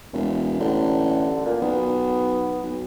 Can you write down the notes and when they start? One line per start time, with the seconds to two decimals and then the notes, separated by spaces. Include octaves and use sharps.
0.13 E1 F#2
0.60 A1 D3
1.46 A#2
1.62 B1 B3
2.63 B1